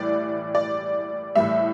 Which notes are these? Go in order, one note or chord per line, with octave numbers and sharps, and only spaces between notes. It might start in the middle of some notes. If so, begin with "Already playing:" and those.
Already playing: A2 E3 G3 D5
D5
A2 E3 G3 E5